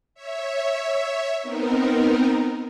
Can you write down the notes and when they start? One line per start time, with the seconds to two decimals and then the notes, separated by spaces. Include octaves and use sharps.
0.14 C#5 E5
1.42 B3 C4 D#4 A#4